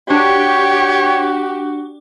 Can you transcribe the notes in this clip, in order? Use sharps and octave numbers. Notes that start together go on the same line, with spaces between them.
D4 F#4 G4 C#5